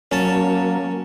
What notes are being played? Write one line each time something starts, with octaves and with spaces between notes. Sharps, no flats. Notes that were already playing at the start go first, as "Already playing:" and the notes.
F#3 A#3 C#4 A5